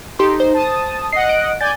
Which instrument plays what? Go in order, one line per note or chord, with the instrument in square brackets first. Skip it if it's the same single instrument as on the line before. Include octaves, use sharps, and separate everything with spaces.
[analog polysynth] D#4 [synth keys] G4 A4 C6
[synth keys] C5
[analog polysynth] A5 D#6
[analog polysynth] D#5 F#5 [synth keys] C7
[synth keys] D7
[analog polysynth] D5 G#5 G6 [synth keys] A6